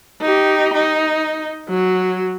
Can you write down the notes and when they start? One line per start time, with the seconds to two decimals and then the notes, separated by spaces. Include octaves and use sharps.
0.22 D#4 G4
0.74 D#4
1.69 F#3